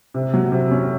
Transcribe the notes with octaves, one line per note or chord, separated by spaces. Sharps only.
C3
F#3
C3
C#4